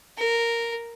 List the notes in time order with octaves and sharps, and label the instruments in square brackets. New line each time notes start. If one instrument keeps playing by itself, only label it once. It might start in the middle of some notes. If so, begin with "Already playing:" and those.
[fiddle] A#4